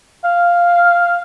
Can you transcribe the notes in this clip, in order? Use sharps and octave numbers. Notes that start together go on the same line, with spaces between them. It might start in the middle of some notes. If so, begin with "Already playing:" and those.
F5